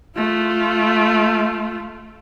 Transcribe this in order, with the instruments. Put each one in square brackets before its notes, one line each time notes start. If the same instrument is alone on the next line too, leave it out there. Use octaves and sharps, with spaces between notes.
[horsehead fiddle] A3 F4